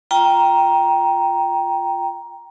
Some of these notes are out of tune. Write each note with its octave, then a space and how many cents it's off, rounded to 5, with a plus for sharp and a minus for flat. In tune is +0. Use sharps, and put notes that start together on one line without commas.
F4 +0 G5 +0 A#5 +10